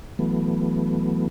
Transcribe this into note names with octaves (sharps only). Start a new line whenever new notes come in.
E3 F#3 A3 B3